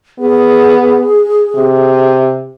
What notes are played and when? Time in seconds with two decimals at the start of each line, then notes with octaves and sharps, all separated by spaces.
0.19 B3 G#4
1.55 C3